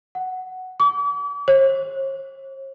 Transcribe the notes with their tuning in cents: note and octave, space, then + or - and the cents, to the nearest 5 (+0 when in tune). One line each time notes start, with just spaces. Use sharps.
F#5 +5
D6 -45
C#5 -45